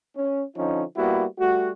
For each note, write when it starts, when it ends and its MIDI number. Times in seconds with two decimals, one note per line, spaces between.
0.16 0.43 61
0.57 0.83 50
0.57 0.83 53
0.57 0.83 61
0.57 0.83 63
0.97 1.25 55
0.97 1.25 58
0.97 1.25 59
0.97 1.25 64
0.97 1.25 66
1.39 1.70 55
1.39 1.70 57
1.39 1.70 66